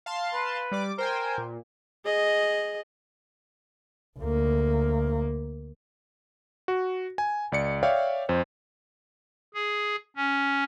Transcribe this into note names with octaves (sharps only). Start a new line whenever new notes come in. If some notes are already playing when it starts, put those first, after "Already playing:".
F5 A5 C6
B4
G3 D5 D6
A#4 C5 G5 G#5
A#2
G#4 D#5
D2 A#3
F#4
G#5
C#2 D5 C#7
C#5 D5 E5 F5 G5
F2 C5
G#4
C#4